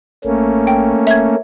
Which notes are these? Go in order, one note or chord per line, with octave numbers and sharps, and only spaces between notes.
A1 A3 A#3 C#4
G5
D1 E5 G#6